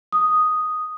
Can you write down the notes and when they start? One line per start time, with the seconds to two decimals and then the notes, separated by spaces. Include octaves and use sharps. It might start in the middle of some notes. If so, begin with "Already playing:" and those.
0.12 D#6